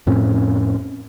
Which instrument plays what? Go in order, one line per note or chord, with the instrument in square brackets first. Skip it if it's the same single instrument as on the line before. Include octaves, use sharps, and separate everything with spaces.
[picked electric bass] F2 A2 C4 C#4